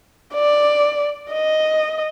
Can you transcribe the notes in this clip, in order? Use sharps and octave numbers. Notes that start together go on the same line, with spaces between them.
D5
D#5